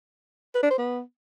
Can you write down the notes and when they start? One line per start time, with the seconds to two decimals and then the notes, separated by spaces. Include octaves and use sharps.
0.55 B4
0.63 D4
0.71 C5
0.78 B3